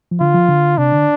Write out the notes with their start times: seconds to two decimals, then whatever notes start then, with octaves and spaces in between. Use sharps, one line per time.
0.11 F3
0.20 D3 F4
0.35 F3
0.49 D3
0.77 C3 D4
0.92 D3